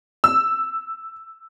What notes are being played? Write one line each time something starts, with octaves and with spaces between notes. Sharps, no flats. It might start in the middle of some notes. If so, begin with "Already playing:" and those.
E6